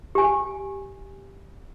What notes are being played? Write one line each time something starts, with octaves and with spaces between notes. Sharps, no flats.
G4 G#5